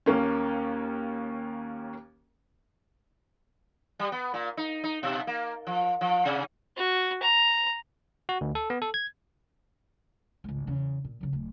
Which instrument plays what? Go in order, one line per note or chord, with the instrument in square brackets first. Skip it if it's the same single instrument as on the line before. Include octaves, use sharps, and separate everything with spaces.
[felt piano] D#2 A#3 C#4
[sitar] G3
B3
A#2
D#4
D#4
B2
A#3
F3
F3
C3
[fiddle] F#4
A#5
[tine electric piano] F#4
D2
A4
B3
A4
G#6
[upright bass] G#1 C#2
E2 C#3
A#2
B1 C#3
D1